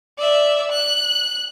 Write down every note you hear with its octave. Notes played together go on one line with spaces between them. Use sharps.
D5 E5
F#6